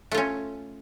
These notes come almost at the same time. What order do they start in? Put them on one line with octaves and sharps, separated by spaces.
A3 F4 C#4